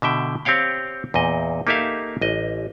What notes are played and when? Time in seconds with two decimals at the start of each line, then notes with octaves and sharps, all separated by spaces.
0.02 B2 D3 E5 G5
0.45 C4 G4 C#5 F5 G5
1.14 E2 A#2 D#5
1.67 A#3 D#4 G4 A4 E5 F5
2.21 A1 D#5